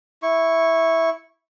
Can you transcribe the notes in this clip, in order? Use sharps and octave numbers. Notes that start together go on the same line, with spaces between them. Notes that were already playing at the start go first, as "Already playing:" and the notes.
E4 C#6